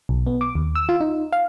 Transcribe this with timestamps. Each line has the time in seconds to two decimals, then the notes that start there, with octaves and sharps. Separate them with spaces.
0.09 B1
0.27 B3
0.41 D6
0.55 D#2
0.75 E6
0.89 F4
1.01 D#4
1.33 F5